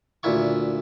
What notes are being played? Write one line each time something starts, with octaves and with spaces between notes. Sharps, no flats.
D2 A#2 E4 C#6